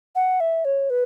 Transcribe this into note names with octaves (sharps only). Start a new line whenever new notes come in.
F#5
E5
C#5
B4